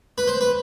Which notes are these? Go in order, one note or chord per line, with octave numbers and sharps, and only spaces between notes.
B4
C5
B4